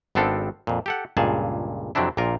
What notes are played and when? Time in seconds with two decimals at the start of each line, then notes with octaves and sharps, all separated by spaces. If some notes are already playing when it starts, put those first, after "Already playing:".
0.15 G#1 B3 C4 D4 A4 F5
0.67 F2 A#2
0.86 G4 A4 F#5
1.17 C#2 G2 A#2 G#4 A5
1.95 F2 C3 F#3 C4 D4 E4
2.17 A#1 A#2 A#3 F4 A#4